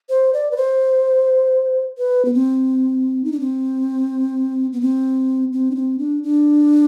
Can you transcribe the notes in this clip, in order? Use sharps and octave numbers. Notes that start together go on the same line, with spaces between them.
C5
D5
B4
C5
B4
B3
C4
D#4
D4
C4
B3
C4
C4
D4
C4
D4
D4